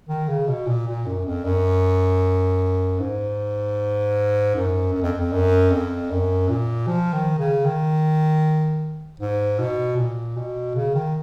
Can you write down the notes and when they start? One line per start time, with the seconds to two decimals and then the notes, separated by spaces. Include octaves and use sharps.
0.08 D#3
0.28 C#3
0.47 B2
0.67 A#2
0.87 A#2
1.06 F#2
1.25 F2
1.44 F#2
2.99 G#2
4.55 F#2
4.93 F#2
5.02 F2
5.18 F2
5.32 F#2
5.70 F2
6.10 F#2
6.49 A#2
6.87 F3
7.13 D#3
7.39 C#3
7.65 D#3
9.20 G#2
9.59 B2
9.97 A#2
10.37 B2
10.75 C#3
10.94 D#3